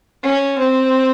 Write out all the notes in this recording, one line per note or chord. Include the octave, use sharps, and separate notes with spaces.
C#4
C4